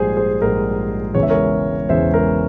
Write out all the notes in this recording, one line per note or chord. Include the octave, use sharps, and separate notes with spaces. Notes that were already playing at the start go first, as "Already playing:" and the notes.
Already playing: A#1 G#2 G3 G#4 C5 G#5
G#4 C5
A#1 G#2 G3 A#4
E1 E2 C#3 E3 G#3 C#5
E5
A#4 C#5
E1 E2 C#3 E3 G#3 C5 E5
A#4